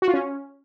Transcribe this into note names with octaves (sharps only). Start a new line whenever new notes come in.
F#4
F4
C#4